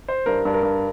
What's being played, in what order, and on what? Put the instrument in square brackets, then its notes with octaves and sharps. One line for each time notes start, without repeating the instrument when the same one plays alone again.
[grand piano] C5
[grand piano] G2 [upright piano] A#4
[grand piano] G2
[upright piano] A#4
[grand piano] G2